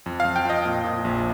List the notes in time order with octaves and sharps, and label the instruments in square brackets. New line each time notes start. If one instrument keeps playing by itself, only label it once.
[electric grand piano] F2
F5
F2
G5
F2 D#5
A#2
A#2
A#1